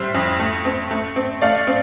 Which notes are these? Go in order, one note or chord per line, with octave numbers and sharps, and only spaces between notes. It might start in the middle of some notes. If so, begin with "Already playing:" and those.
Already playing: A2 G3 C5 E5
F2
A3
C4
A3
C4
A3 D5 F5
C4